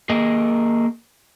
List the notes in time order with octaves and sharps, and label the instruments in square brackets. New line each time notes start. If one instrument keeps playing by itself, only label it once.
[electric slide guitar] A#3 G#4 A#4 D#5